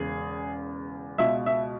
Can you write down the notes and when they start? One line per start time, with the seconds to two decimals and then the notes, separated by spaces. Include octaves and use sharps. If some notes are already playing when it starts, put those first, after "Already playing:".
Already playing: E1 E2 C#3 G#4
1.18 C#2 B2 E5
1.46 E5